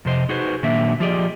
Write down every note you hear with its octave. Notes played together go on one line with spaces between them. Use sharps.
F2 C3 C5 D#5
D#4 F#4 G#4 B4 C5
A#2 D#3 F#3 A#3 D4 E5
F3 F4 G4 G#4 D5 D#5